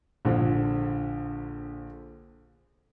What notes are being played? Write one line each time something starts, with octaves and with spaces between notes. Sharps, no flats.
A#1 D3 F3